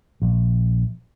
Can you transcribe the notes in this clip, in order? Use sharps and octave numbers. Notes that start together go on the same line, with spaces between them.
A#1